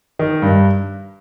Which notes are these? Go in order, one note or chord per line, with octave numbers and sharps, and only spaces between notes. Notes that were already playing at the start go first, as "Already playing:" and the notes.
D#3
G2